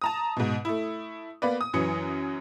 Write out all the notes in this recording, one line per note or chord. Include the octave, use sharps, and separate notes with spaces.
A5 A#5 D#6
G#2 B2
A3 E4
A#3 B3 B4 D5
D#6
F#2 E3 F#3 C#7